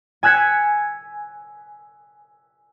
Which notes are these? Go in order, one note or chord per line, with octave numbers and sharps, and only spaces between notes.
G#5 E6 F#6 G#6 B6 C#7